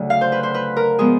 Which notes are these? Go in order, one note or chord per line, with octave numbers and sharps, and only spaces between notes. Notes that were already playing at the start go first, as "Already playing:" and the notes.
Already playing: D2 C#3 F#3
F5
C5
B4
C5
B4
A#4
F3 G#3 B3 G#4